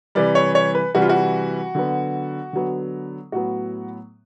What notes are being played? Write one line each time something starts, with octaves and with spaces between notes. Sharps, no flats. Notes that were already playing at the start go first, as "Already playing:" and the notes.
C3 E3 G3 D5
C#5
C#5
B4
C3 E3 G3 F#4
F4
F#4
D3 F#3 B3
D3 F#3 B3
A2 F#3 B3 F#4